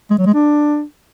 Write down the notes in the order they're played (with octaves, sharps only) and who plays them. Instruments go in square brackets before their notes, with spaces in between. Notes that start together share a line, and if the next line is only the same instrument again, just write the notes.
[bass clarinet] G#3
F#3
G#3
D4